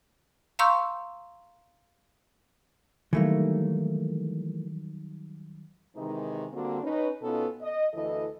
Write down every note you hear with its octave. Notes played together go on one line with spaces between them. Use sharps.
F5 A#5 C6 C#6 E6 G6
D#3 E3 F#3 G3 A3 A#3
C3 D#3 E3 G#3 D#4
D3 G3 A#3 C4 D4 F#4
C#4 D#4 B4
B2 B3 C#4 D#4 F4 A4
D#5
D2 E3 E4 A4 D#5